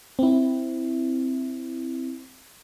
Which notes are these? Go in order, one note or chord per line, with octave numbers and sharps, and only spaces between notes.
C4 E4